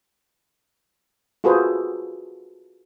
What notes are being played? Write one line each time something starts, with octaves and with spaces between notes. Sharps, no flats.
F4 F#4 G#4 A4 B4 C5